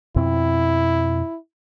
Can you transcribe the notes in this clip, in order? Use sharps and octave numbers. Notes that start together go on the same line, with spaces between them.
F2 B2 C4 E4